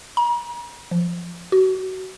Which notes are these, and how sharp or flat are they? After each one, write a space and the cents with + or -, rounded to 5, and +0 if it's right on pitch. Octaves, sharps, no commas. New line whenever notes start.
A#5 +40
F3 -10
F#4 +25